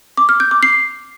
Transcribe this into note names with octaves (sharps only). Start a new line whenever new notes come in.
D6
F6
G6
D6
C7